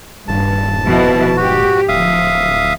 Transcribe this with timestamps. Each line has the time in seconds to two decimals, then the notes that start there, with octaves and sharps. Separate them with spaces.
0.28 D#1 G2 A5
0.83 F2 B2 E4
1.37 G#2 F#4 G4
1.88 D1 F3 E5 F5 D#6